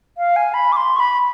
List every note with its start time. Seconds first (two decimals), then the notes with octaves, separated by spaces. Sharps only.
0.18 F5
0.36 G#5
0.54 B5
0.72 D6
0.77 C6
0.96 C#6
1.00 B5